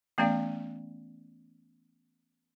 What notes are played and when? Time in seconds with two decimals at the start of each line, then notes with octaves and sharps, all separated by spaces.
0.18 E3 A3 B3 C#4 D5 F5